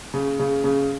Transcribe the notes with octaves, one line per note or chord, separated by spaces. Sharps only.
C#3
C#3
C#3